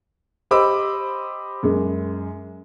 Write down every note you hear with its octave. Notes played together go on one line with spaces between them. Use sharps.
G4 C5 D#5 B5 D6 E6
F#2 G#3